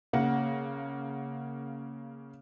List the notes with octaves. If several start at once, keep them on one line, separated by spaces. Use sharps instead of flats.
C#3 A#3 F#5